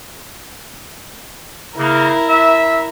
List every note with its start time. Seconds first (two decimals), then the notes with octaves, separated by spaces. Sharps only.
1.78 C#3 A#3 E4 A#4
2.28 E5